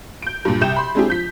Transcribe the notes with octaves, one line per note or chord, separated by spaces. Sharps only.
G6 D7
G2 A#2
C2 G5 G6 E7
B5 C6
G#3 C4 D4 E4 G4 G#4
F3 G6 B6